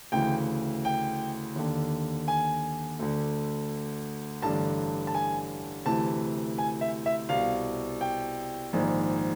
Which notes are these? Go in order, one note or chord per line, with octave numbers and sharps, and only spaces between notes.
D2 C#3 E3 G5
G5
D#2 D3
G#5
D2 D3
A1 G2 D3 A5
A5
G#5
D2 C3 E3 A5
G#5
E5
E5
C2 B2 F5
G5
A#1 G#2 D#3